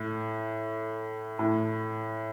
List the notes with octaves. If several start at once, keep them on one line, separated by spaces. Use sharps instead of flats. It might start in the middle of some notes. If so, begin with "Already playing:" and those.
Already playing: A2
A2